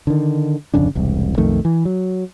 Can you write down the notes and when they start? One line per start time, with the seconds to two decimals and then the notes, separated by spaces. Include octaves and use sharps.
0.07 D3 D#3
0.74 D1 F2 C#3 D4
0.95 E1 C2
1.38 B1 F2 D#3 A3
1.65 E3
1.85 F#3